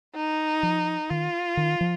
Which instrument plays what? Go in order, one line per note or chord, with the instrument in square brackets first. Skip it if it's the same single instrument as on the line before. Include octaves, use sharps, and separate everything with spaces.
[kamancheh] D#4
[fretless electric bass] F3
[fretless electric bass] D#3 [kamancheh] F4
[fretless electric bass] D#3
F3